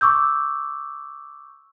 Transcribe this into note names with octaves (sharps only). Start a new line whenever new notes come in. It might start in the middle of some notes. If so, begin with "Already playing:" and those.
C#6 D6 E6 G6